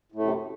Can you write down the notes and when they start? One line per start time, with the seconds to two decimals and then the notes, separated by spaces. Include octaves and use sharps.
0.12 A2
0.16 A3
0.19 F#2
0.23 C3